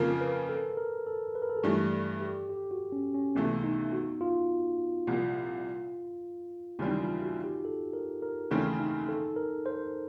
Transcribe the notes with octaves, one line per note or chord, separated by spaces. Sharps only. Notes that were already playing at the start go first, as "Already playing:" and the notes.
Already playing: F2 C#3 F3 A#3 A#4
B4
A4
A#4
A4
B4
A#4
A4
G#4
G2 E3 A3 G4
A4
G4
G4
F#4
C#4
C#4
C#2 C3 E3 A3 B3
D#4
F#4
F4
C2 A#2 F3
D#2 C#3 E3 G3 C4 D#4
F4
F#4
G4
A4
A#4
A#4
D#2 C#3 E3 A3 C4 G#4
D#4
A4
A#4
C5